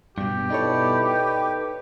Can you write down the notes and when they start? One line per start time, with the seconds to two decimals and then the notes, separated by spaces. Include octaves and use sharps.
0.18 G2 B2 G4
0.50 B2 D#4 E4 A4 C#5 D5
1.05 B4 G5